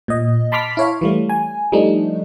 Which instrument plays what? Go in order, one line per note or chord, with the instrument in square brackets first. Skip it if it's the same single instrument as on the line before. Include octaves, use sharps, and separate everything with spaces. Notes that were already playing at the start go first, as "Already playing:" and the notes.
[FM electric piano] A#2 D#5
A5 B5 C6 D6 F6 B6
E4 C#5 F5
E3 G3 A3
G#5
F3 G3 A3 D4 D#4